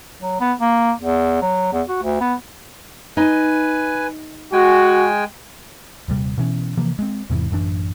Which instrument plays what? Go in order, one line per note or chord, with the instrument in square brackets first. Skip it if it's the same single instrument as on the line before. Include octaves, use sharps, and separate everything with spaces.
[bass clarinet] F#3
B3
A#3
E2
F#3
E2
F#4
D2
B3
[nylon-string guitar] D#4 [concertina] B4 G#5
[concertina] G#3 G5 G#5 [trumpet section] F#4
[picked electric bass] D#1 C3 G3
B2 E3 C#4
C3 E3 F3 A#3
G#3 C4
E2 G#2 C3 E3
A1 F#2 E3 D4